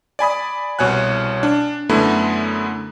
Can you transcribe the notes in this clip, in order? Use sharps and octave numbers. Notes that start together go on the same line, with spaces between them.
D5 G#5 B5 D#6
C2 B2 C#5 G#5 F#6
D4
F#2 D3 A3 B3 E4